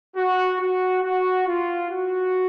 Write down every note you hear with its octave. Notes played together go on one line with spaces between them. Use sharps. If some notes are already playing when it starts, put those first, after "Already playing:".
F#4
F#4
F#4
F4
F#4